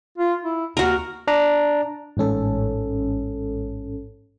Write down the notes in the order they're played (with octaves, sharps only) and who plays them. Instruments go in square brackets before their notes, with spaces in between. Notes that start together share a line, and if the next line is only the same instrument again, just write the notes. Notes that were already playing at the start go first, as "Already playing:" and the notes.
[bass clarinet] F4
E4
[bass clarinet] D#2 [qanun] F#4 A#4
[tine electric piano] D4 A#5
[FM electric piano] A1 G#2 C#4 A4